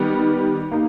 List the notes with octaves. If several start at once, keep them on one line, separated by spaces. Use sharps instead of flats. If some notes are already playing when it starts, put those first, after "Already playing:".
Already playing: D#3 G3 B3 G4
A#3 D#4